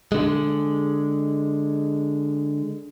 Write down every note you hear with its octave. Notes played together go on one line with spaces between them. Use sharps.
D3 G#3